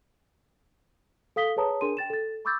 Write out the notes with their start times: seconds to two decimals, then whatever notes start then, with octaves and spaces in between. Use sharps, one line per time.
1.36 A4 F5 D#6 B6 G7
1.56 G#4 B4 C#5 A5 A#5 D#6
1.81 D4 G#4 A#4 G#5 C6 D#7
1.97 G5 A6 E7
2.10 A4 A6
2.45 B5 C#6 D6 E6 G6 A6